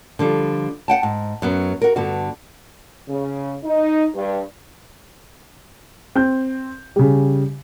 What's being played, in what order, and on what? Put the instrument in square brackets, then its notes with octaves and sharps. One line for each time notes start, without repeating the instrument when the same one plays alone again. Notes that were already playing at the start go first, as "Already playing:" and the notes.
[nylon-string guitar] D3 F3 G3
F#5 G5 A5
G#2
F#2 F#3 B3
F#4 A#4
G2 D3 B3 D4 F#4
[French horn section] C#3
D#4
G2
[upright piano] C4 G6
C#3 G3